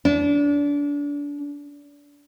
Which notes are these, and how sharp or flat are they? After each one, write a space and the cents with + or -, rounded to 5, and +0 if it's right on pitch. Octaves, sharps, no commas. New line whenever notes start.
D4 -30